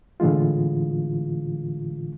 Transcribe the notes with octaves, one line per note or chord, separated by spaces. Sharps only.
A2 D3 E3 G#3 F4